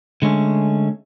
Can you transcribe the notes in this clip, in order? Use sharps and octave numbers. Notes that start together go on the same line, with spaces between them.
D3 G#3 A3 C#4